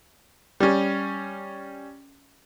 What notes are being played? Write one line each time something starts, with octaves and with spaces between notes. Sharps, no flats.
G3 C#4